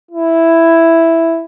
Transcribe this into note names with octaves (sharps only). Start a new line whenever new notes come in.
E4